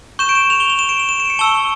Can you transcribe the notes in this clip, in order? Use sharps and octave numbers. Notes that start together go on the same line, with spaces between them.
C#6 G6 E7
D7
E7
F7
G7
F7
E7
D7
F7
E7
D7
C#7
A5 C#6 E6 G7